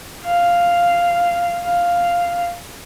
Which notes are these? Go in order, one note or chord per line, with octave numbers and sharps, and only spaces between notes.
F5
F5